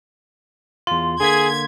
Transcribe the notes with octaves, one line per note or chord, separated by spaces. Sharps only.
E2 F4 C6
D3 A#3 G#4 G#6 B6